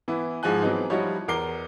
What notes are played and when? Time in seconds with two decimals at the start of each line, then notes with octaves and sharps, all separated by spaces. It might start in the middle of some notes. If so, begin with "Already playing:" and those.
0.08 E3 B3 E4
0.43 G#2 F3 G#3 G#5 F#6
0.62 E3 F#3 B3 C4 D#4
0.90 F3 G3 D#4 E4 F#4 C#5
1.28 E2 A#4 D6 C7 G7